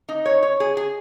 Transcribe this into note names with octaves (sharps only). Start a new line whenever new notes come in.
D#4
C#5
C#5
G#4
G#4